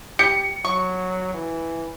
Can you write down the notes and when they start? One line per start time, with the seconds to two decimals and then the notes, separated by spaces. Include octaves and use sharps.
0.19 G4 C#7
0.65 F#3 C#6
1.34 E3